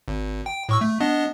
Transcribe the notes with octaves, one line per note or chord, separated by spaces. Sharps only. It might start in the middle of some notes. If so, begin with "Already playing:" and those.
G#1
G5
A2 C#6 E6
A3
B3 D4 D#5